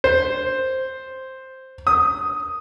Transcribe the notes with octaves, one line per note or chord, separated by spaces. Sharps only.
C5
D#6